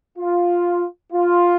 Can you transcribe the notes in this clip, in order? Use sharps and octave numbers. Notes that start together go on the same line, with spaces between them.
F4
F4